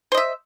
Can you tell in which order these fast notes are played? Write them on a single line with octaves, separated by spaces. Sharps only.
C5 D#5 E5